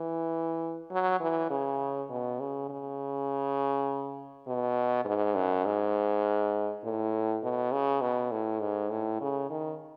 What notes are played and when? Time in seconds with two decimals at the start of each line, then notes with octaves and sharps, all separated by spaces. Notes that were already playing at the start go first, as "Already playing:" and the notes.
Already playing: E3
0.92 F#3
1.21 E3
1.51 C#3
2.10 B2
2.40 C#3
2.70 C#3
4.47 B2
5.05 G#2
5.36 F#2
5.66 G#2
6.84 A2
7.43 B2
7.72 C#3
8.02 B2
8.32 A2
8.61 G#2
8.90 A2
9.21 C#3
9.50 D#3